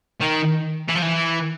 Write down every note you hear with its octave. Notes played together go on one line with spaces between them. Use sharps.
D#3
E3
F3
E3